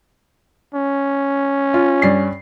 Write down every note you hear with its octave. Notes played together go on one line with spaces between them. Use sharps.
C#4
F4
G2 D5 C7